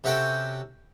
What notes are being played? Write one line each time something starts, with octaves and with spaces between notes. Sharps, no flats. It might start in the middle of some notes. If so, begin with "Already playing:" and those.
C3 C#4 F#4 A4 G5